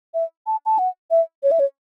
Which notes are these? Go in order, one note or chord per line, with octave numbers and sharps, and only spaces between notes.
E5
A5
A5
F#5
E5
C#5
E5
C#5